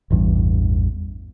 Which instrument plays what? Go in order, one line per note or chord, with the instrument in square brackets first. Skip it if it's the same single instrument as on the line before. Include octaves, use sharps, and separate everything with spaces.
[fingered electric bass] A1 E2 G2